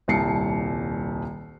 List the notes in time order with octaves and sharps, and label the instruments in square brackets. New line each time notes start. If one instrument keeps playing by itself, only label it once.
[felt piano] D#1 C2 A5 C7 C#7